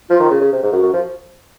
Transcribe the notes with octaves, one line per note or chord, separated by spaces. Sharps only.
F3 F4
D#3
C#3
C#3
C3
G#2
F#2 F#4
F#2
F3